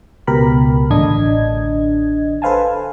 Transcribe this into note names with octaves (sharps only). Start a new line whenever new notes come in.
C#2 B2 G4 A#4 B5
A1 D3 D4 D#5 G#6
A4 B4 C5 F5 G#5 A5